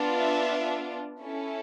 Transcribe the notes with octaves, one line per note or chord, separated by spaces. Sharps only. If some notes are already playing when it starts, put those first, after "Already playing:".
Already playing: B3 D4 F4
E5
C#4 E4 A4